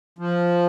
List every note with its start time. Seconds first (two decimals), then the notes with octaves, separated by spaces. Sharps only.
0.19 F3